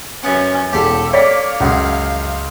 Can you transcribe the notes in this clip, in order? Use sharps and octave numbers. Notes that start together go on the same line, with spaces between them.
F#2 B3 C#4 F#5
E1 G4 A4 B5 C6
A#3 C#5 D5 F5 B6
C#2 F#2 G#4 F#5